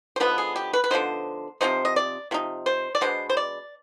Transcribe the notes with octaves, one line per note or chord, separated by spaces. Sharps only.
C5
D3 F3 B3 D#4 B4
G#4
G4
B4
B4
D3 F3 B3 D#4 C5
C3 F3 C4 D#4 C5
D#5
D5
C3 F3 D#4
C5
D5
B2 G#3 B3 D4 C5
C5
D5